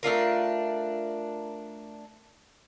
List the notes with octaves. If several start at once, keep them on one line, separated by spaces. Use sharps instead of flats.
A3 D4 F4 A#4